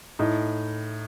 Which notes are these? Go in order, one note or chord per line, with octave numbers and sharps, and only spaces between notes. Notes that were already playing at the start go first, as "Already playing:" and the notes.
A2 D#4